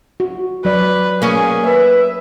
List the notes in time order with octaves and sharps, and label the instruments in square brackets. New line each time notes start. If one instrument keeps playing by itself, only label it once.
[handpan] F#4
[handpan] F#3 D5 [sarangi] B4
[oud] A#3 C#4 [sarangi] G#4
[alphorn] B4 [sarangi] E5